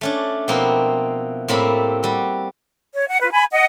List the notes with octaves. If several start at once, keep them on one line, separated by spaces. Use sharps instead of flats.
A3 C#4 D4
B2 F3 A#3 C4 E4
A2 G3 A#3 C4 E5 B5
G3 F#4
C#5
F#5
F4 B4
G#5 B5
D#5 F#5